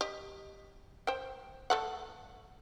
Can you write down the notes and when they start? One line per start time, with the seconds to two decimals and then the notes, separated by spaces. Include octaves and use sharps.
0.01 G4 D#5
1.07 C5 G5
1.70 A3 A4 F#5